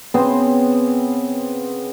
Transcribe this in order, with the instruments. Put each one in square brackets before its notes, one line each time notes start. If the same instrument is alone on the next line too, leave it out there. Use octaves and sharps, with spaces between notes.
[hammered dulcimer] C#3 B3 C4 C6